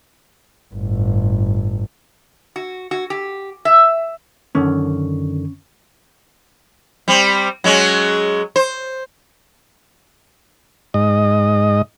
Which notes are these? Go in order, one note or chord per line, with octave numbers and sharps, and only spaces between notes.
G1 A2
F#4
F#4
G4
E5
F#2 D3 D#3 C#4
G3 C4
F#3 G#3 C#4
C5
G#2 D#5